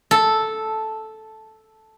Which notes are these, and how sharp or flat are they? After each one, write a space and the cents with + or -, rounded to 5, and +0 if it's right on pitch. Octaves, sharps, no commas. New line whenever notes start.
A4 -5